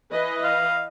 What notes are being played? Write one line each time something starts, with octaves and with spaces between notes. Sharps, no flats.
E3 B4 D#5
F5